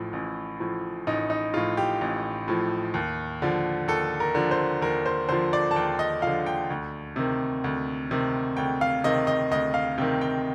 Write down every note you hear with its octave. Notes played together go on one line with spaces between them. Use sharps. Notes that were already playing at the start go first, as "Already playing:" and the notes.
Already playing: A1 A2 F3
A1
A2 F3
A1 D#4
D#4
A2 F3 F4
G4
A1
A2 F3
D#2
D3 F3
D#2 A4
A#4
D3 F3
C5
D#2 A#4
C5
D3 F3 C5
D5
A5
D#2 G5
D#5
D3 F3 F5
G5
D2
C3 D#3
D2
C3 D#3
D2 G5
F5
C3 D#3 D#5
D#5
D2 D#5
F5
C3 D#3 G5
G5